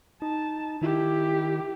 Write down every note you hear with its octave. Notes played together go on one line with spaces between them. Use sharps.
D#4 A5
D#3 E4 G4